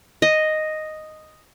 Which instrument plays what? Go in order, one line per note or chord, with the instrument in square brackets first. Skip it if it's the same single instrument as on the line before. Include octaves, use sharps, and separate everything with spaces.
[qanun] D#5